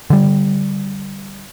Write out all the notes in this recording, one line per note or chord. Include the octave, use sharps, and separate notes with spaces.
D3 G3